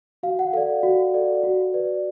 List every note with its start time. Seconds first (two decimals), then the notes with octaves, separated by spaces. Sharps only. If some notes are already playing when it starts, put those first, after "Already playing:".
0.23 F#4 F5
0.39 F#5
0.53 A4 D5 F5
0.83 F#4
1.14 A4 D5
1.43 F#4
1.74 B4 D5